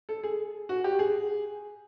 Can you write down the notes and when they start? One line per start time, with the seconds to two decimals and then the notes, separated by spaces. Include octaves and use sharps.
0.09 A4
0.24 G#4
0.69 F#4
0.84 G4
0.99 G#4